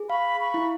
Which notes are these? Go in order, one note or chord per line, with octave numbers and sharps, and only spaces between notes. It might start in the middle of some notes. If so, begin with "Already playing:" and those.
Already playing: G#4
F5 B5 C#6
B5 C#6
E4